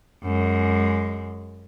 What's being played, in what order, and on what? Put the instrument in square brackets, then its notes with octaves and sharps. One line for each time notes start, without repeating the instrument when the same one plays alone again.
[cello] F#2 G#3